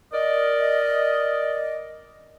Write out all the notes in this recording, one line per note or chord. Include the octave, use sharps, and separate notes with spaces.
A#4 D5 D#5